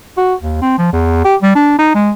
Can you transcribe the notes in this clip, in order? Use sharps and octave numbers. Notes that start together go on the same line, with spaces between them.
F#4
D#2
C4
F3
E2
G4
G3
D4
D#4
G#3